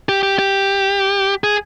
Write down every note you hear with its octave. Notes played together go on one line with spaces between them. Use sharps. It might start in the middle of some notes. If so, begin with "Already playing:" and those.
G4
G4
G4
G#4